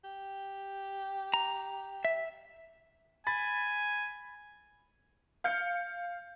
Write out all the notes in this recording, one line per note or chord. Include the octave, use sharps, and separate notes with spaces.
G4
A#5
E5
G#5 B5 A6
F5 G6 C#7